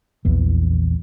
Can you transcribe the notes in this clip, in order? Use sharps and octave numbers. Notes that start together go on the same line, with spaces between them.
A#1 E2 E3